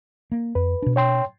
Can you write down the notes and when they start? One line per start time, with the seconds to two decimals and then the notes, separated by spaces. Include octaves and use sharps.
0.32 A#3
0.55 F2 B4
0.82 B2 D4
0.96 C#5 G5 C6